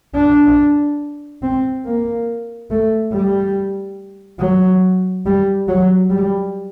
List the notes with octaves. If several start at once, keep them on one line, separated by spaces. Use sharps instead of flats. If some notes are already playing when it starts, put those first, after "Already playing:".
D4
C4
A#3
A3
G3
F#3
G3
F#3
G3